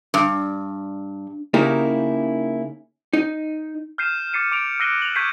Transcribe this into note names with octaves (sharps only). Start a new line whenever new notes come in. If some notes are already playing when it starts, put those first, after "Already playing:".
G2
C#3 A#3 D#4 E4 G4 A#4
D#4
F6 G6 C7 D#7 E7
D6 A6 C7 C#7 D#7
D6 D7 F7
E6 F#6 A#6 C7 D#7 G7
F7 F#7
C#6 G6 G#6 B6 C7 D#7